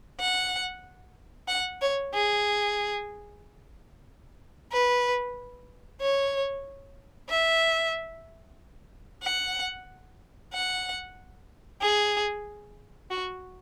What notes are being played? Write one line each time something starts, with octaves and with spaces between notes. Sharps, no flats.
F#5
F#5
C#5
G#4
B4
C#5
E5
F#5
F#5
G#4
F#4